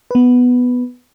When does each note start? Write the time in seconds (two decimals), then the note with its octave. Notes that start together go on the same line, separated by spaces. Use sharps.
0.11 B3 B4